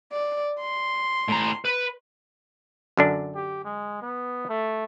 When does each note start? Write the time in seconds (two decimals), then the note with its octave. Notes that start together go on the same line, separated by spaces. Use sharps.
0.13 D5
0.60 C6
1.28 A2 A#5
1.65 B4
2.97 F#2 D3 D4
3.34 G4
3.64 G#3
4.02 B3
4.49 A3